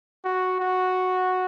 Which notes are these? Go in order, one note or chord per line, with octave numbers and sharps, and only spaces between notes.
F#4
F#4